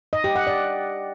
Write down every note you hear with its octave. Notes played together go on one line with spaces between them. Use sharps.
D#5
G4
F#5
D5